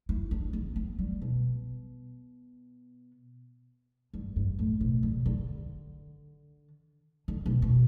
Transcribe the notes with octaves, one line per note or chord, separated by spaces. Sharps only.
E4
D4
B3
B3
G3
B2
G2
G2
A2
B2
D3
D3
D3
B2
B2